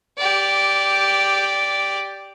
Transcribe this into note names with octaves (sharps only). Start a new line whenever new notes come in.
G4 D5